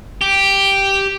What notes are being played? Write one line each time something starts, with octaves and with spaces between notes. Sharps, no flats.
G4